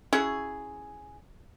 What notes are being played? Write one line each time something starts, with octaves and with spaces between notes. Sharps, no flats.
C#4 E4 F#4 G#4